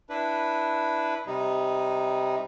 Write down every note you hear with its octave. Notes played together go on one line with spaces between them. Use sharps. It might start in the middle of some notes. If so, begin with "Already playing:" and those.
D4 E4 B4
C3 G3 D#4